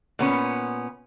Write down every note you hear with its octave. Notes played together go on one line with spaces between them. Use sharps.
A#2 B3 C#4